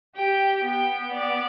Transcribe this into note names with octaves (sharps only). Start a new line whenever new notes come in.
G4 G5
B3 G5
D5